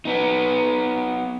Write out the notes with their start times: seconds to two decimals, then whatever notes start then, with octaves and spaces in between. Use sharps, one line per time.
0.05 B3 D#4